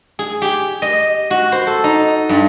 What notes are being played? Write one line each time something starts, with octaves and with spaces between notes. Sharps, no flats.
G#4
G4
D#5
F#4
C5
A4
D#4
G2